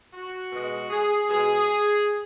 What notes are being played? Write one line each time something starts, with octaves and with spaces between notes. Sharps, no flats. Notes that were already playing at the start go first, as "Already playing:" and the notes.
F#4
B2 G#3
G#4
B2 G#3 G#4